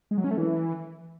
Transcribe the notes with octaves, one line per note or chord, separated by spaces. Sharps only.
G#3
F#3
C#4
A3
E3